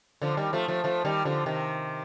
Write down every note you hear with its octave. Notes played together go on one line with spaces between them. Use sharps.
D3 F3
D#3 G3
F3 A3
F3 A3
F3 A3
D#3 G3
D3 F3
C3 D#3